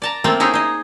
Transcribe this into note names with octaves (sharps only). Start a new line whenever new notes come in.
D5 A5 A#5
A3 A#3 C4 F4
D#4 E4 G#4 C5 C#5
D#4 D#5